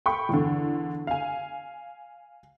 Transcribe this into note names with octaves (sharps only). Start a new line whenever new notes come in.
G5 B5 C#6
E2 D3
F5 G#5